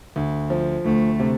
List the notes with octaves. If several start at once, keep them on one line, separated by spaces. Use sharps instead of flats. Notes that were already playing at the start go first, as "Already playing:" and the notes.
D2
F3
D2 A3
C3